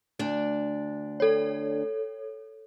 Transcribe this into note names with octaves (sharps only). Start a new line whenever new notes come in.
D2 D4 D5
A4 C#5